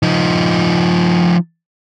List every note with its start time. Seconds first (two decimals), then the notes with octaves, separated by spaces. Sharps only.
0.03 F3 D#4